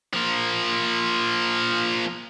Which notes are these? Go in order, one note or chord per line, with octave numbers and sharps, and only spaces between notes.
F3 A#3